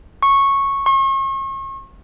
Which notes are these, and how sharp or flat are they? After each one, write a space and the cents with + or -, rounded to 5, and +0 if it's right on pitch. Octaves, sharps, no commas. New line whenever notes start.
C#6 -10
C#6 -40